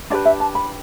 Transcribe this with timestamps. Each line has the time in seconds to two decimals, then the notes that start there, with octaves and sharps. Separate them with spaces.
0.10 D4 G4 B4 D5
0.25 E5
0.40 A5
0.55 B5